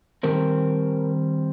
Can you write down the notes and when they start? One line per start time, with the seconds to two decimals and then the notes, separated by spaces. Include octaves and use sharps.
0.23 D#3 G3 C4 A#4